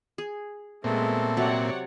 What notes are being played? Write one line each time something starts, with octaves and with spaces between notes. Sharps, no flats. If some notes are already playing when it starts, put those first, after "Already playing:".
G#4
A#2 G#3 A3 B3 C4 A4
C3 F#3 G4 C#5 D5 F#5